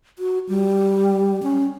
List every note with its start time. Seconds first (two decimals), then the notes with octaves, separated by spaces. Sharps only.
0.19 F#4
0.49 G3
1.43 C#4